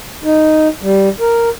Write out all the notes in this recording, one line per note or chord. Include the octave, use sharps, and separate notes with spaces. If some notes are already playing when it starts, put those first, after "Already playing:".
D#4
G3
A#4